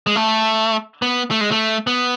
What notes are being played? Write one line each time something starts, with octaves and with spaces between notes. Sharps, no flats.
G#3
A3
B3
A3
G#3
A3
B3